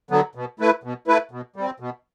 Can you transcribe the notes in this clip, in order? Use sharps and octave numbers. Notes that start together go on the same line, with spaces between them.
D3 F#3 B3
B2
A3 E4 B4
B2
A3 E4 B4
B2
G3 C4
B2